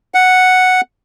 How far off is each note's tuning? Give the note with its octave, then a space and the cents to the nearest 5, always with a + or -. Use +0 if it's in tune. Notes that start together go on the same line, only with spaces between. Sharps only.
F#5 +0